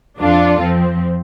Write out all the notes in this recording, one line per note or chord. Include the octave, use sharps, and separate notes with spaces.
F2 F3 D4 F4 A4
F2 F3 C4